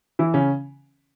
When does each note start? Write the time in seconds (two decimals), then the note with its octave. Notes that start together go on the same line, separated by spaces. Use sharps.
0.19 E3 E4
0.34 C#3 C#4